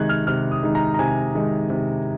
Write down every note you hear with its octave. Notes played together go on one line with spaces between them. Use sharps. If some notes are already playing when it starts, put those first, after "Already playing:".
Already playing: C3 D#3 G#3 D#4 F#6 G#6
F6
C3 F6
D#6
D#3 G#3 D#4
A#5
A#5
C3 G#5
D#3 G#3 D#4
C3